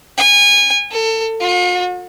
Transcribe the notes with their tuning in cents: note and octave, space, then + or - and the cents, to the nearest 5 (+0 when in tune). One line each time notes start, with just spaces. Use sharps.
G#5 -25
A4 +30
F4 +45